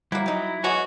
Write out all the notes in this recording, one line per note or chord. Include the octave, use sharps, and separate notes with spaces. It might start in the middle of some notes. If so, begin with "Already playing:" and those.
F#3 G3 A#3 E4
F#3 D#4 G4
E3 G#3 B3 F#4 C#5